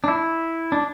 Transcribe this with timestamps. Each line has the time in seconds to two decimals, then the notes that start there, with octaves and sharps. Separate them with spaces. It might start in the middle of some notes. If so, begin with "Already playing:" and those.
0.04 D4
0.08 E4
0.72 D4